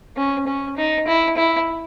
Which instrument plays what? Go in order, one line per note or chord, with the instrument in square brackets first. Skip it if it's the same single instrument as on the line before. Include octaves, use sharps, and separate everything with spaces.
[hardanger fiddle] C#4
C#4
D#4
E4
E4